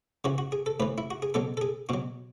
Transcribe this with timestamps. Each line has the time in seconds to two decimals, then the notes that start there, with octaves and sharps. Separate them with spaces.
0.24 C#3 E3 F#4
0.38 F#4
0.52 G#4
0.66 A4
0.80 A2 E3 B4
0.98 E4
1.11 F#4
1.22 G#4
1.34 B2 F#3 A4
1.57 A4
1.61 G#4
1.89 B2 F#3 F#4